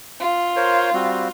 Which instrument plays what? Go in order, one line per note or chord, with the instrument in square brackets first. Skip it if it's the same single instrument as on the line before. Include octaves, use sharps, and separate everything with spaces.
[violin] F4
[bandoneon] A#4 C5 C#5
G3 C4 F#4